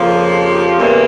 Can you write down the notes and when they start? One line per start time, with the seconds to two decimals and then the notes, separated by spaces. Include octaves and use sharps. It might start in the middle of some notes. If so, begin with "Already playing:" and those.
Already playing: F2 C#3 F3 A#3
0.31 G4
0.77 E2 C#3 E3 G3 A#3